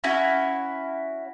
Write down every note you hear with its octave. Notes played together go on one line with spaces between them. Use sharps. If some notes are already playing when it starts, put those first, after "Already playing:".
C#4 E4 F#4